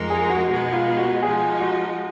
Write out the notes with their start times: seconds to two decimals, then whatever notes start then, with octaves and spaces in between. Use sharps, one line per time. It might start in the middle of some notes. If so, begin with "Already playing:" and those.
Already playing: F2 F3 G#3 D#4 A#4
0.10 G#4
0.30 F#4
0.48 B2 G#3 B3 D#4 F#4
0.72 F4
0.98 F#4
1.22 F3 G#3 D#4 G#4
1.60 F#4